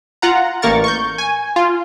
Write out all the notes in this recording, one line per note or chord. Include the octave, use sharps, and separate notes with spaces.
F4 F#5 A#5
A1 A#3 A#4 C#6 A6
C#6 G6
G#5
F4